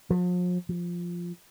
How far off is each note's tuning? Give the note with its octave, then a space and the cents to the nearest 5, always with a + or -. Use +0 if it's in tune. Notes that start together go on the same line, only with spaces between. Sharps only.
F3 +40
F3 +0